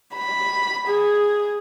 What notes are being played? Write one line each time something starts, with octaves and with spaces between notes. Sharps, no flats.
B5
G#4